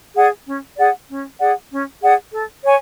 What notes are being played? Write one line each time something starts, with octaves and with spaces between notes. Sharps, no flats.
G#4 D5 F#5
C#4
G#4 D5 F#5
C#4
G#4 D5 F#5
C#4
G#4 D5 F#5
A4
C#5 G#5